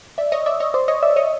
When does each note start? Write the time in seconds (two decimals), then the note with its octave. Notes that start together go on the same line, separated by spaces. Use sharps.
0.18 D5 E5
0.32 C#5 D#5
0.46 D5 E5
0.60 C#5 D#5
0.74 C5 D5
0.88 C#5 D#5
1.03 D5 E5
1.16 C#5 D#5